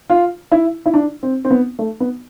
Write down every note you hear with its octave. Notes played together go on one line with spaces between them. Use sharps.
F4
E4
E4
D4
C4
C4
B3
A3
B3